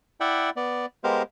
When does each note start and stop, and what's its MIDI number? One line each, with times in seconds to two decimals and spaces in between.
0.20 0.50 64
0.20 0.50 74
0.20 0.50 76
0.20 0.50 78
0.20 0.50 79
0.56 0.86 59
0.56 0.86 74
1.04 1.22 56
1.04 1.22 59
1.04 1.22 67
1.04 1.22 70
1.04 1.22 72
1.04 1.22 77